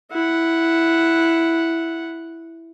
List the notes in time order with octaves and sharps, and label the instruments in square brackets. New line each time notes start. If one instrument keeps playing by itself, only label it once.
[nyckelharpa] E4 F#5